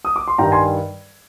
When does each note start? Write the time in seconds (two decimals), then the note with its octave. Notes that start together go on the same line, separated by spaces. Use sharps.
0.05 D#6
0.16 D6
0.28 C6
0.38 G2 D#3 G3 G5 A#5
0.52 G#5 C6